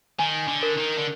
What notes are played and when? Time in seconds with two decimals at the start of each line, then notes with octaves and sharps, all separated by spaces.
0.19 D#3 G#5
0.48 D3
0.63 A#4
0.77 D#3
0.98 D3